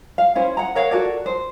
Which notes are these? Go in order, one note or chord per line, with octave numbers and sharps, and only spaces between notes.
F5
C#4 E4 C5
F#5 A#5
A#4 C#5 F5 F#5
F#4 A4 A#4 D5
C5